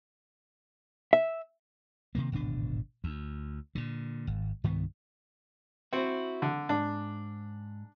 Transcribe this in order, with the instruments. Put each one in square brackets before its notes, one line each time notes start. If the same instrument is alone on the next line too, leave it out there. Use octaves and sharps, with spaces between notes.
[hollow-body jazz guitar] E5
[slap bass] C3 D#3 A#3
D1 G#1 B2 D4
D2
A#2 D3
G#1
C2 G2 D#3 B3
[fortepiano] C4 [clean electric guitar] E4 F#4
[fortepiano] D3
[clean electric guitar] G#2 [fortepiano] D4